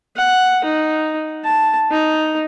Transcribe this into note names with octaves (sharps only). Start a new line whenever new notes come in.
F#5
D#4
A5
D#4